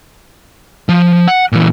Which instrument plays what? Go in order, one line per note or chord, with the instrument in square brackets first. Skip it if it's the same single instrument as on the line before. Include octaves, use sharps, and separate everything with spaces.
[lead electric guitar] F3
F#5
A#2 E3